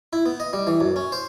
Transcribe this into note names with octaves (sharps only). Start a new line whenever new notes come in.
E4
B3
D#5
G3
E3
F#2
C#4
C5